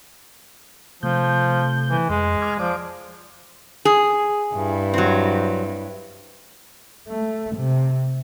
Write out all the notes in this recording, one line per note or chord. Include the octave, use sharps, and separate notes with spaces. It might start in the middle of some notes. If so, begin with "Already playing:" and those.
C3 F3 A3 G6
E3
F2 G#3
D6 F6 G#6
F3 D5 D6
G#4
G2 E4
F#3 C4
A3
C3